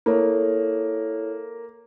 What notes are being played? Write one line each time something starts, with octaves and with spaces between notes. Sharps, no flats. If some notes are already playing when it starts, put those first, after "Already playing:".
A#3 E4 A4 C#5